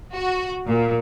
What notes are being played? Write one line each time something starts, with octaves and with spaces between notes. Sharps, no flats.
F#4
A#2